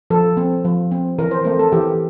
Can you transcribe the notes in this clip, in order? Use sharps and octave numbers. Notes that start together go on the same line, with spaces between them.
F3 A4
C4
F3
C4
E3 A#4
C5
A3 C4 A#4
A4
E3 G4